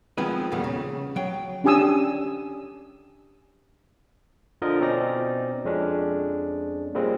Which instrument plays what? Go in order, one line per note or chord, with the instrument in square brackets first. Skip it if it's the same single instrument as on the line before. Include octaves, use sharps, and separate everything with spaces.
[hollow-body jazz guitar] D#3 F3 G#3 B3 C4 B4
E2 A#2 G3 A3 B3
C#3
F#3 G5
[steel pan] C#4 D4 G4 G#5 D#6 E6
[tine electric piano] D3 F3 F4 A#4 D#5
B2 C4 C#4 D#4 D5 A#6
F2 G#3 C#4 D4
A#2 C#3 G3 G#3 C4